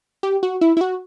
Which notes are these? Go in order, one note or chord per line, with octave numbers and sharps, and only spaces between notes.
G4
F#4
E4
E4
F#4